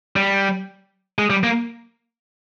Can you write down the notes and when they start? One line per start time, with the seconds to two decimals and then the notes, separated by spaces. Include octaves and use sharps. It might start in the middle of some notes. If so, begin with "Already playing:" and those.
0.16 G3
1.19 G#3
1.30 G3
1.44 A#3